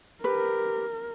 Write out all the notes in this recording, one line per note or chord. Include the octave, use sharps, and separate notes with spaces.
G4 A#4 B4